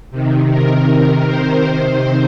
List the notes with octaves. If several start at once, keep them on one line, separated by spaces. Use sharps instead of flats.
C3 D#3
A#4
C5
C3 D#3